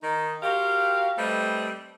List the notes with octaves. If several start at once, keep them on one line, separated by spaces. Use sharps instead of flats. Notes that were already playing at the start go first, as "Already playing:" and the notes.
D#3 D#4
F#4 G4 A#4 C5 F5
G3 A3 C4 A4 B4 D#5